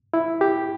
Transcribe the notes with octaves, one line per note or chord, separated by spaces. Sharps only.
E4
G4